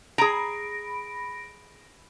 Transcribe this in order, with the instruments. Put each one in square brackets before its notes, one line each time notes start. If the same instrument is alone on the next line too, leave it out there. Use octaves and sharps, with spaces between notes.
[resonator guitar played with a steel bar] G#4 A#5 [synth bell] B5 A#6 D7